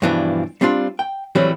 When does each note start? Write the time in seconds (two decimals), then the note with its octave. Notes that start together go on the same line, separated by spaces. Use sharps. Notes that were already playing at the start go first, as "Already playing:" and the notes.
0.02 G2 B2 E3 F3 D4
0.61 G3 C4 D4 F4
0.99 G5
1.35 A2 E3 F#3 G3 C4